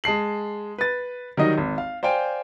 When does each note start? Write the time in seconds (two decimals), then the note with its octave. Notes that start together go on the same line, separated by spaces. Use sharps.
0.04 G#3 A5 C7 F#7
0.78 B4 A6
1.37 D#3 F#3 G3 D#4 D#5
1.58 G#1
1.78 F5
2.03 C5 D5 F5 G5 G#5